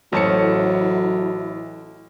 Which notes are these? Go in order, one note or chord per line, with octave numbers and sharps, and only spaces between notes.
A1 F#3 E4 A4 C5 C#5 A5 C#7